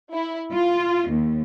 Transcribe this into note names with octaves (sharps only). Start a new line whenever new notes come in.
E4
F4
D#2